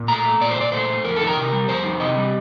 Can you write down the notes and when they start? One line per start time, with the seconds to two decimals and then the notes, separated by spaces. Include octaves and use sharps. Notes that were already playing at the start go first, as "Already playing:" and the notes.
Already playing: A#2
0.08 A3 A#5
0.25 A3
0.41 A#2 D5
0.51 C5
0.56 A#2 D5
0.72 A3 C5
0.89 A3
1.04 F2 A#4
1.16 D#3 A4
1.27 A#4
1.37 C3
1.53 G3
1.68 F2 C5
1.84 D#3
2.00 C3 D#5
2.17 G3